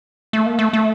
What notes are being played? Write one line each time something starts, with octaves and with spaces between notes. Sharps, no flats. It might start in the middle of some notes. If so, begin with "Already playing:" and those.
A3
A#3
A3
A3